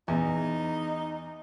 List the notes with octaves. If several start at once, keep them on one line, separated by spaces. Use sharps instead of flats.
E2 D#4